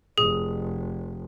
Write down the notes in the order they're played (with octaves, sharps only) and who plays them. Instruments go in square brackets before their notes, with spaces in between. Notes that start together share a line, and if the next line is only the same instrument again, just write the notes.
[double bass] F1 [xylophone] G#4